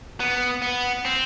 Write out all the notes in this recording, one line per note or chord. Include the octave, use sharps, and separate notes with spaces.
B3
B3
C4